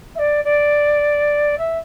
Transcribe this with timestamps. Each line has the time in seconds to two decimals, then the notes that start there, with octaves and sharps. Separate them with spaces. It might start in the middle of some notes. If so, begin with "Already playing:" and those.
0.15 E5
0.19 D5
0.44 D5
1.58 E5